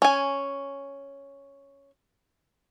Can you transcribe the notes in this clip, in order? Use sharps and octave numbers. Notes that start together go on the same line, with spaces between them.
C#4 G#5